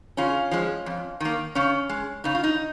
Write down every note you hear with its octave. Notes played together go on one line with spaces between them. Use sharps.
C#3 C#4 F4
F3 G#3
F2
D#3 A#3
C#3 C#4
G#3
C#3 D#4
F4
D#4